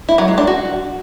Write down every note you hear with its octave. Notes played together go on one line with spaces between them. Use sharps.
E4
F#3
G#3
D4
F#4